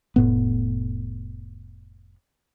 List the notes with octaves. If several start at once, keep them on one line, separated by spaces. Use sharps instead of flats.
F1 A2 B3